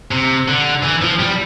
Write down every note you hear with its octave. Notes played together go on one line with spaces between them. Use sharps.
C3
D3
E3
F3
G3